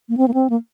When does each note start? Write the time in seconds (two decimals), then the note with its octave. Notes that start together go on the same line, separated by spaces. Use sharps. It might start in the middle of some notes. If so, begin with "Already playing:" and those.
0.09 A#3
0.17 C4
0.28 A#3
0.34 C4
0.50 A#3